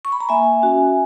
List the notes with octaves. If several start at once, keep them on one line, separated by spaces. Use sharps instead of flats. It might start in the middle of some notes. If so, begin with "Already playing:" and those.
C#6
B5
A#5
A#3 E5 G#5
C#4 F#4